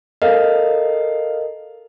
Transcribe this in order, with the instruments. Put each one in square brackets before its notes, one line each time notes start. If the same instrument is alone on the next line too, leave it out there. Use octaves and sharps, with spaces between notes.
[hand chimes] A4 A#4 D#5 [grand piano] F5